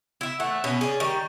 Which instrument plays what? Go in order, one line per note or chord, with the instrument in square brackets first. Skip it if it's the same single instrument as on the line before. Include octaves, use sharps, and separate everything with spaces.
[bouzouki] E4 E5
[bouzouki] A3 [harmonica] E5 F#5
[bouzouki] B2 [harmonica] C#4
[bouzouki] G#4 D5
[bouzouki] D#3 G3 [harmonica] C#6